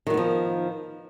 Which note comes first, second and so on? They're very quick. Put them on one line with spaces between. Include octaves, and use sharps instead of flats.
D#3 F#3 B3 F3